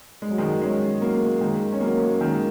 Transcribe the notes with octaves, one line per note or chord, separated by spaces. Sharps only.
G#3
F#3
D#3 G#3
G#3 C#4
F#3 A#3
D#3 G#3
C#4
F#3 A#3
D#3 G#3